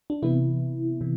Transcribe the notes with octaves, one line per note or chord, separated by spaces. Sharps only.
D4
C3 E3 B3 E4
C3 E3